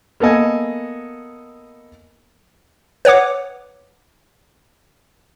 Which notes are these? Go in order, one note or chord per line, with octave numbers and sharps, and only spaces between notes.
A#3 B3 A4 D#5 G#5
B4 C#5 F#5 D6